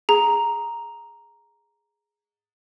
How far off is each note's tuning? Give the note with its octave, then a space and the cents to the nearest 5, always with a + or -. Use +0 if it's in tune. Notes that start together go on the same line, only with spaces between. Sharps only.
G#4 +0 A#5 +0